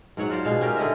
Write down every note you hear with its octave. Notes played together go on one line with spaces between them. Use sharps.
G#2 F#3 C#5 F#5
F4 F#4 C5 D5
B2 G#3 F5
C#4 G4 A#4 D#5
D3 C#4 D#5 E5